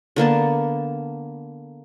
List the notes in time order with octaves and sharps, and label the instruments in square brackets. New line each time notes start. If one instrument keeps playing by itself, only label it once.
[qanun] D3 A#3 B3 A5